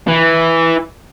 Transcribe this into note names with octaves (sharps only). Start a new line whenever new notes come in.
E3